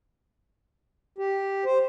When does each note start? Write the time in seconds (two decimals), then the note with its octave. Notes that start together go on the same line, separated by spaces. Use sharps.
1.18 G4
1.65 C5